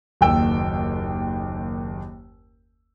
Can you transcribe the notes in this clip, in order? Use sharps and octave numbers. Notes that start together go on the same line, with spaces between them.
F#1 D#2 G5 E6